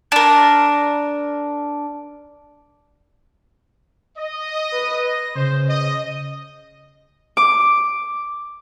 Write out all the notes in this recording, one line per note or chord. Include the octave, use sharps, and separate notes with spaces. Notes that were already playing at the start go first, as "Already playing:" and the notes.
D4 A#4
D#5
B4
A#6
C#3 C5
D#5
D6